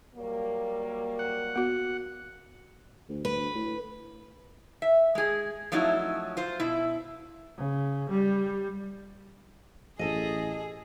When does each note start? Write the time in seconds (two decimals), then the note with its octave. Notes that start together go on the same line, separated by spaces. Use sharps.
0.15 F#3 G3 A#3
1.19 F#5
1.56 B3 F#4
3.09 D2
3.25 D2 B4
3.55 A2
4.82 E5
5.15 G#3 G#4
5.72 F3 F#3 A3 C#4 D#4 E4
6.37 F4 C5
6.60 B2 E4
7.57 C#3
8.10 G3
9.99 A1 G#4 A4 D#5